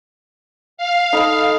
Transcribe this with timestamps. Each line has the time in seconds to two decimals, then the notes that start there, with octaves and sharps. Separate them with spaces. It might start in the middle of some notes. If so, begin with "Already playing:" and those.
0.77 F5
1.13 D#4 A4 B5